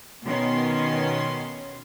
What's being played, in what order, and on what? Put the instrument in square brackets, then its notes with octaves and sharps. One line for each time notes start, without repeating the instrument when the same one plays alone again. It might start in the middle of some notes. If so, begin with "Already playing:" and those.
[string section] B2 D#3 B3 C#4 C6